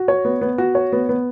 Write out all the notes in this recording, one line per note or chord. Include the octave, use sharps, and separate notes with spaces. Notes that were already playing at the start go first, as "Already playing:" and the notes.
Already playing: F#4
C#5
B3
B3
F#4
C#5
B3
B3